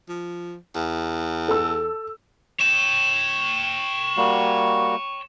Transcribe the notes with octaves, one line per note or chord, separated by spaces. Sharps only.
F3
E2
A4 E6
C#5 G5 E7
G3 A#3 F#4